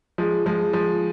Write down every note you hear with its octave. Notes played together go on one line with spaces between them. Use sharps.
F3 G#3
F3 G#3
F3 G#3